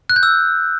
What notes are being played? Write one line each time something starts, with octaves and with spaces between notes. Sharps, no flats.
F#6
G6
E6